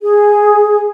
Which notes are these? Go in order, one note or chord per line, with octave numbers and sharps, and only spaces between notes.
G#4